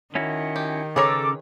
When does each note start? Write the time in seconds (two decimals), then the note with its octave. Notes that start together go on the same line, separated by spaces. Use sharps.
0.15 D#3 C#4 E4 F#4
0.56 G4
0.96 C#3 C#4 G#4 A4 B4 C#5 A#5 D6